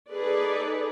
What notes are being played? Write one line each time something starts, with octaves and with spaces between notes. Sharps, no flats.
D#4 G#4 A4 B4 D5